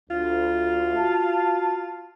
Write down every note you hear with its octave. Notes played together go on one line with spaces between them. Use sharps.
D2 F4
F#4 F5 A5